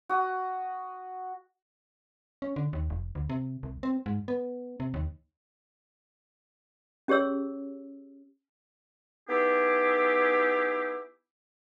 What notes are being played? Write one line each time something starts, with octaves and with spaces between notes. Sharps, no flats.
F#4 D#6
C#4
D3
D#2
F1
D2
C3
C2
C4
G#2
B3
C3
D#2
C#4 G4 G#4 C#5 E6
B3 D#4 E4 G4 G#4